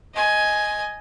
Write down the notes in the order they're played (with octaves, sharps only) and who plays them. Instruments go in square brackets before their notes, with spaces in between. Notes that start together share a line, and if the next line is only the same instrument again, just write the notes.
[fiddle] D#5 G#5